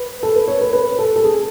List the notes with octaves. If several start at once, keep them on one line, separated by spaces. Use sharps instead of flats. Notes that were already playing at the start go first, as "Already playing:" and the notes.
Already playing: B4
A4
B4
C#5
B4
B4
A4
A4
G#4